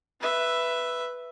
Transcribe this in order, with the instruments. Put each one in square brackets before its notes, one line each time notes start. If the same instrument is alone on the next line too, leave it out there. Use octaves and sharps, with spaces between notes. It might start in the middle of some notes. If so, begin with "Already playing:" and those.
[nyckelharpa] B4 E5